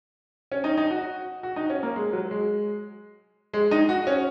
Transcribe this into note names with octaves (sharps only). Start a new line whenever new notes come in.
C#4
D#4
D#4
F#4
F#4
D#4
C#4
A#3
G#3
F#3
G#3
G#3
D#4
F#4
C#4